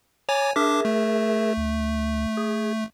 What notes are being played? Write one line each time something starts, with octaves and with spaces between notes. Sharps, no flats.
C#5 G#5 A#5 D6 A6
D4 G#4 A#4 E5 D6
A3
D2
G#4